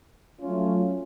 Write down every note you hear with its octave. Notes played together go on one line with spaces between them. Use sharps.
F#3 A3 C#4 F4